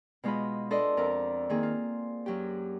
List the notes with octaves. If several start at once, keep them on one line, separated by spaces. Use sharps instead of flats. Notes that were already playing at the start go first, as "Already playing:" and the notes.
B2 G#3 F4 D#5 B5
D4 A4 B4 D5 D#5 C6
F2 A#4 D6
D#3 A#3 C4 G#4
F4
F#2 F#3 G4